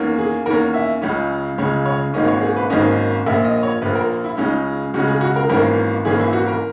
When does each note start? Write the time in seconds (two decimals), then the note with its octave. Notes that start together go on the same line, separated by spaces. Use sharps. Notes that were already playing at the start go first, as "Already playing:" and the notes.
Already playing: E2 D#3 A#3 C#4
0.19 G#4
0.46 E2 D#3 A#3 C#4 A#4
0.74 E5
1.02 C#2 C#3 G#3 C#4
1.58 C#2 C#3 G#3 C#4 C#5
1.86 C#5
2.14 G#1 G#2 D#3 A#3 C#4 D#5
2.28 C#5
2.41 G#4
2.56 B4
2.70 G#1 G#2 D#3 A#3 C#4 D#5
3.26 A#1 A#2 A#3 E5
3.45 D#5
3.63 C#5
3.82 A#1 A#2 A#3 B4
3.95 A#4
4.24 E4
4.37 C#2 C#3 G#3 C#4 D#4
4.94 C#2 C#3 G#3 C#4 F#4
5.07 G#4
5.21 F#4
5.36 A#4
5.49 G#1 G#2 E3 A#3 C#4 A#4
6.05 G#1 G#2 E3 A#3 C#4 G#4
6.20 E4
6.33 F#4
6.48 A#4